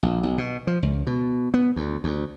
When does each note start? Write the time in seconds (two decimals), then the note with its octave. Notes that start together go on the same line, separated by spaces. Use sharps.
0.03 A#1
0.23 B1
0.38 B2
0.67 F3
0.83 C#2
1.07 B2
1.54 B3
1.76 D2
2.04 D2